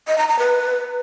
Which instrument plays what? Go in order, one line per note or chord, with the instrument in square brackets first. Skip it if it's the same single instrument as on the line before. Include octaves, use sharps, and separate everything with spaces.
[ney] D#5
A#5
A#5
B4